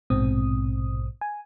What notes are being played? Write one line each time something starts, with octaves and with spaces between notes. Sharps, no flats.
A#1 G#2 B2 C4 D#6
G#5